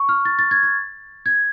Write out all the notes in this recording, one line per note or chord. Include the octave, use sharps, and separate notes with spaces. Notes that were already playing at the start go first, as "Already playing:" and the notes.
Already playing: C#6
F6
A6
A6
G#6
A6
G#6